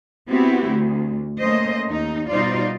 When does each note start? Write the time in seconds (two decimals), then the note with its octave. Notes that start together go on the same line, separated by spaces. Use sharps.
0.29 B3 C4 E4 F#4 G4
0.67 D2
1.40 A3 A#3 C#4 C5 D#5
1.88 D#2 D#4
2.28 B2 G3 D#4 F4 C5 D5